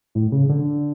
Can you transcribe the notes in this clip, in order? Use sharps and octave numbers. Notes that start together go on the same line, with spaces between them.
A2
C#3
D3